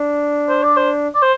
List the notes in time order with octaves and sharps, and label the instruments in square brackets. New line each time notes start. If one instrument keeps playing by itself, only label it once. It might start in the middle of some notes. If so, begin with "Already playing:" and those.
Already playing: [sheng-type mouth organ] D4
[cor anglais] C5
D5
C5
D5
C5